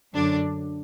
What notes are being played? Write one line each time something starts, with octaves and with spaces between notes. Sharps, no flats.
F#2 D3 F#3 D4